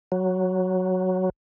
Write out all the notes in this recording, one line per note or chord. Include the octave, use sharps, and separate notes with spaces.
F#3